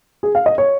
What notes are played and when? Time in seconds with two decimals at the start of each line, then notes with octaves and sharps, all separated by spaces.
0.23 G#4
0.35 F5
0.46 D#5
0.58 C#5